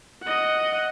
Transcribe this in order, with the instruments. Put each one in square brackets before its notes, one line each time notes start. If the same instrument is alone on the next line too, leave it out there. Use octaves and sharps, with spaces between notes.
[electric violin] D#5 F#5